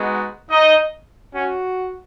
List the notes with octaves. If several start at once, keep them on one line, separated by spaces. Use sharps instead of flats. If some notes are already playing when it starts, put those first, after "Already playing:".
Already playing: G#3 B3 D#4 F#4
D#4 D#5
C#4 F#4